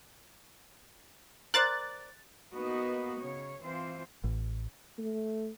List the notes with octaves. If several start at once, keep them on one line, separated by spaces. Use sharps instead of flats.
A#4 C5 D5 F#6 A6
A#3 B3 D#4 F#4 B4 D#5
C#3 C#5
E3 C4 F4 C5
A1
A3